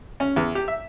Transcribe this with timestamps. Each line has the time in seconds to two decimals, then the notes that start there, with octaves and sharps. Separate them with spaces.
0.20 C#4
0.36 E2
0.55 G4
0.68 E5